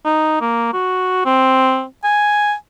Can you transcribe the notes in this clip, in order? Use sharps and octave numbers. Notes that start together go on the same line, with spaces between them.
D#4
A#3
F#4
C4
G#5